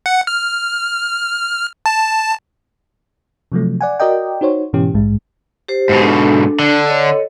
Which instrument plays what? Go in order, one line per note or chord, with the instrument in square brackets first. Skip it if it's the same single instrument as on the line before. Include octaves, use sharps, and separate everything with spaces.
[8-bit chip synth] F#5
F6
A5
[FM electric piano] C3 F3 F#3 A3
D5 F#5 G#5
F#4 A#4 D5 D#5 G5
D#4 F#4 C5 C#5
G#2 B2 E3 C#4 G4
A#1 G#2 G#3
[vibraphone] G4 C5
[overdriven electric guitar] G#2 B2
[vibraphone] D4 A4
[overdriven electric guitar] D3
[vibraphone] A4 C#5 D#5